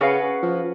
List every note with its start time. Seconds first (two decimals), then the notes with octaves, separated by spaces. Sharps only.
0.01 C#3 C#4 F#4 B4 F5
0.42 F3